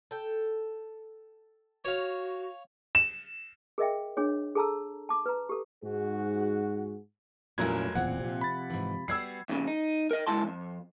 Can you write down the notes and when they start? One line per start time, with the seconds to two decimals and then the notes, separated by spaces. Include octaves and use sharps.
0.11 A4 G5
1.85 F#4 C#5 F5
2.95 E7
3.78 G#4 A#4 D#5 E5 G5
4.17 D4 G#4 C#5
4.55 G#4 A4 A5 A#5 E6
5.09 A5 D6
5.26 B4 A#5
5.49 G4 A4
5.84 G#2 F#4 G#4
7.58 F1 A#2 F#3 C#4 E4 A#4 G#6
7.95 D1 E2 A#2 C4 F#5
8.20 C3 F3
8.41 B5 A6
8.70 G#2 E3
9.08 G3 B3 F#4 E6 G#6 C7
9.49 F2 A#2 C#3
9.67 D#4
10.11 A#4 D#5
10.27 C#2 G#3 E4 A#4 A5 C6
10.44 F2 F3